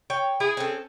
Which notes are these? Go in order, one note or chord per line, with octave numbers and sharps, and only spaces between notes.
C#5 G5
E4 G#4
C4 C#4 A4